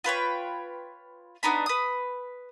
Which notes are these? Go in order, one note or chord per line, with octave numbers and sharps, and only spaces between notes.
F4 B4 C#5 G5
B3 D4 D#4 B5
B4 D#6